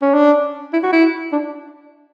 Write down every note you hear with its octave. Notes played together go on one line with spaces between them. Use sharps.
C#4
D4
E4
F#4
E4
D4